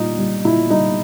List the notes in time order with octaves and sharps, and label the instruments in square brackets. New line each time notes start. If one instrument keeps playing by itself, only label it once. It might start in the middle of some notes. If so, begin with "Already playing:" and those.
Already playing: [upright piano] A#2 G3 D#4
G3
A#2 E4
G3 D#4